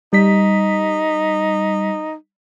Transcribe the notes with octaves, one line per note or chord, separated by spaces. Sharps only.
G3 D#4 B6